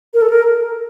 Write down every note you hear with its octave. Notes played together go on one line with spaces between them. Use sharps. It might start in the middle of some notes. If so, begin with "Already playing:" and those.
A#4
A4
A#4